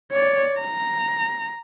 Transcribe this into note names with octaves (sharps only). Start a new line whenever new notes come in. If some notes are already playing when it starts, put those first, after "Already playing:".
C#5 D5
A#5